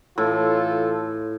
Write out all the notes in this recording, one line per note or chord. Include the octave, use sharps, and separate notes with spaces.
A2 E3 F4 A4